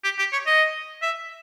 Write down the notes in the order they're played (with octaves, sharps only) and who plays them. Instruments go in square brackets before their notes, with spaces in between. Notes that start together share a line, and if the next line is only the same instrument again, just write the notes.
[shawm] G4
G4
C#5
D#5
E5